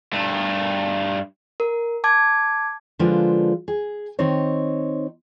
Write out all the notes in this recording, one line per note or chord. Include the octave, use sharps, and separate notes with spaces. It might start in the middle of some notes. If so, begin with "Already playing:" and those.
G2 A3
A#4
A5 D6 G#6
D3 F3 G#3 F4 B4 C5
G#4
D#3 C4 D#4 C5 C#5